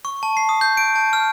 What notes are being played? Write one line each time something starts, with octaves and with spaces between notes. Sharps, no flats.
C#6
A5
C7
D#6
G6
D7
A5
F6